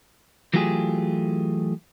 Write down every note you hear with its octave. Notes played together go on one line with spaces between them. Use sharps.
E3 F#3 A3 F4 G4 G#4